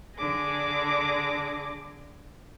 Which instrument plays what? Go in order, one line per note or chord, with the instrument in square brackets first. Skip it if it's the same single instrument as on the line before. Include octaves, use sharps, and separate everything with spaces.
[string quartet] D3 G#4 D6 A#6